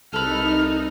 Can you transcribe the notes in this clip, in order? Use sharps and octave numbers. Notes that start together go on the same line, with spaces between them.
C2 D#4 A4 B4 F6